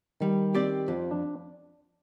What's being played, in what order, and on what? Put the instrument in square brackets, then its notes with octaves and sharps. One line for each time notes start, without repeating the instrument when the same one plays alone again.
[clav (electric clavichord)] D#3 [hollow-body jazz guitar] G3
[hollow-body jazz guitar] C4 G4 D5
[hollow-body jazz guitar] F2 [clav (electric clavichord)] F3
[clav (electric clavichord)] D4